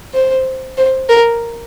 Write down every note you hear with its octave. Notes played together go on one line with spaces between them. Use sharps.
C5
C5
A#4